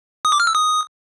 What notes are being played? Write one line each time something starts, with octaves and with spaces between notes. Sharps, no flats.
D#6
D6
F6
E6
D#6